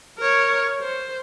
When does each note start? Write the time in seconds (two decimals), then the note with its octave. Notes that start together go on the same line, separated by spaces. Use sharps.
0.19 A#4 C#5
0.80 C5